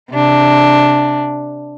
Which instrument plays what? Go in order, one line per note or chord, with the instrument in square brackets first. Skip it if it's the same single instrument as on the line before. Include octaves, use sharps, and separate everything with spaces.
[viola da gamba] C3 D4